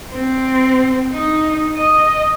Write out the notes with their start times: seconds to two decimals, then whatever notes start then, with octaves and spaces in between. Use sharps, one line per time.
0.12 C4
1.12 D#4
1.76 D#5